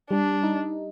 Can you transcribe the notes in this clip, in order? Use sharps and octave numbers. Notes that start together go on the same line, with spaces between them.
G3 D4
D#4